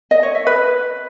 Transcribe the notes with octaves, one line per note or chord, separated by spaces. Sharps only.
D#5
C#5
E5
B4